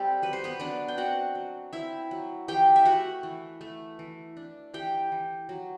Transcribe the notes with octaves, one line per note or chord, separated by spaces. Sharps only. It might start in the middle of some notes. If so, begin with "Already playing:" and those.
Already playing: G3 C4 G4 A4
F#3 B4
C5
B3 B4
F#3 D4 D5
G5
C4 F#4 F#5
F#3
C4 E4 E5
F#3
E3 G4 G5
E5
A3 F#4 F#5
E3
A3
E3
D4
E3 G4 G5
E3
F#3